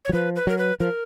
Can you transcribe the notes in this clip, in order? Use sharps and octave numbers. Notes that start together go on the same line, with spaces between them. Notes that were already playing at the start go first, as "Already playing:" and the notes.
C#5
F#3
F3 B4
B4
F#3 A#4
B4
F3 A#4